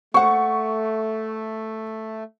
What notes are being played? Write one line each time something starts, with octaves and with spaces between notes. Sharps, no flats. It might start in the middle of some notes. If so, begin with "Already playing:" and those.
A3 C5 F#5 C#6